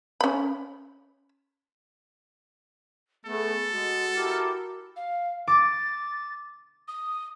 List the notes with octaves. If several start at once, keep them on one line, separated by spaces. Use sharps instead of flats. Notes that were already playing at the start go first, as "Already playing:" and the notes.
C#4 B5
A3 B3 G#4 A4
G#3 F#4
E4 G4 A#4
F5
D6 A6
D#6